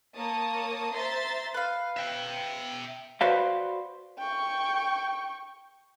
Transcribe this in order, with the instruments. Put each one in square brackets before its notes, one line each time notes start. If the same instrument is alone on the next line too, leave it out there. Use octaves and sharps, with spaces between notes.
[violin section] A#3 A#4 C#5 A5 D#6
C5 E5 A#5 C6 A6
[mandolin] B4 F5
[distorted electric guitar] E5 G5
[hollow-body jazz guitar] F#4 B4 C5 D5 F5
[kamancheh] G5 C#6